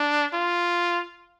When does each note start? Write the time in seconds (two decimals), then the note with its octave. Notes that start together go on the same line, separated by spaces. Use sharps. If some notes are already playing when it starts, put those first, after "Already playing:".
Already playing: D4
0.34 F4